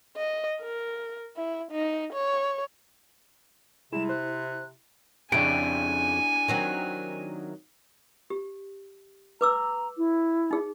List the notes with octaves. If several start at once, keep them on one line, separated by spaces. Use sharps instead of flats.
D#5
A#4
E4
D#4
C#5
C3 G3 G#3 E4 G#4 E7
C5 F#6
F2 C#3 D4 E4 G4 G#5 D7
D#3 F#3 C4
G4
B4 A#5 D6 E6
E4
D#4 G#4